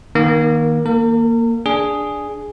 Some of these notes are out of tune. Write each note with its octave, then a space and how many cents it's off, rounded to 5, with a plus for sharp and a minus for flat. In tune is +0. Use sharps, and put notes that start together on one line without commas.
D#3 +0 A#3 +25
A#3 +0 A#4 -40
D4 +0 G#4 +0